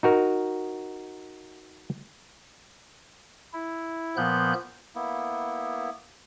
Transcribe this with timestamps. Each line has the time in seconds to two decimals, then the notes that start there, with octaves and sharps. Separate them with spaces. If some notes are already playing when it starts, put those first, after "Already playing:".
0.03 D#4 F#4 A#4
3.53 E4
4.17 A#2 F3 B3 F#6 G6
4.95 A#3 B3 E4